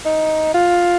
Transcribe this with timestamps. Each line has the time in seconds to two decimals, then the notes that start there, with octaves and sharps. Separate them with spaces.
0.05 D#4
0.55 F4